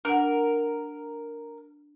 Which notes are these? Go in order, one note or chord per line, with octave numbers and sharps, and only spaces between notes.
D4 A#4 F#5